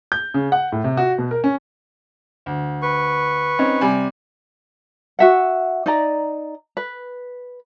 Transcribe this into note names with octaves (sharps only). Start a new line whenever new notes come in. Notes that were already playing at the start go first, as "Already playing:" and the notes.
G6
C#3
F#5
A2
C3
F#4
B2
A#4
C#4
D2
B4 C#6
C4 C#4 D#4
C3 G3 G#5
F#4 E5 F#5
D#4 D5 A#5
B4